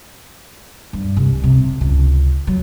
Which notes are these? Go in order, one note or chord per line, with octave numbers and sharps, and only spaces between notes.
G2
C2
C3
C#2
F#3